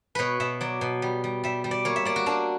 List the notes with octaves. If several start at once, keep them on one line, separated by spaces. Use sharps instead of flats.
B2 B4 C#5
B2 E5
F#3 D5
B2
G3
G3
G3 E5
G3
D5
A#3 C#5
E5
A#3 D5
F#4
A#3 D4